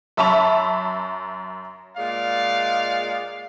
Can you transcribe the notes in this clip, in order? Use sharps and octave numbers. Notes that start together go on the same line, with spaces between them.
F#2 E5 A5 B5 C#6 F7
A#2 G#3 D5 F5